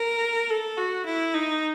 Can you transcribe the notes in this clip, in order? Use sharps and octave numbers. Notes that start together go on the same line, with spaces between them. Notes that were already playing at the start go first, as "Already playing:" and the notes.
Already playing: A#4
A4
F#4
E4
D#4